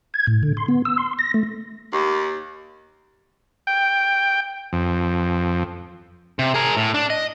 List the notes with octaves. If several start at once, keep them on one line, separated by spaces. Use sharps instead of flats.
G#6
A2
D3
C6
B3
E6
C6
A#6
A3
D#2
G5
F2
C3
G#4 A#4
A2
D4
D#5